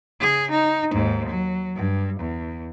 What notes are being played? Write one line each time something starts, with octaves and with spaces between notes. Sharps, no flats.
C#3 G#4
D#4
D#2 G#2
F#3
G2
E2